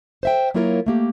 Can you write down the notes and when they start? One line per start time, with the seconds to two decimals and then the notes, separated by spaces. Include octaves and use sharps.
0.23 C5 E5 G5
0.54 F#3 A#3 E4 F4 A#4 C#5
0.86 A3 A#3 G4